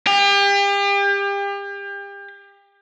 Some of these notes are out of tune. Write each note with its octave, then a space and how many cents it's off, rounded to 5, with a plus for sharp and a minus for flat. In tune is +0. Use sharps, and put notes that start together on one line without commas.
G4 +35